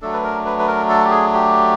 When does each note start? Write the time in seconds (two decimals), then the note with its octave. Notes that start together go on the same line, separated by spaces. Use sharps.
0.02 F#3 A3 D4 A4
0.13 B4
0.24 A#4
0.46 B4
0.59 B4
0.68 A#4
0.89 A4
1.05 G4
1.11 G#4
1.34 G4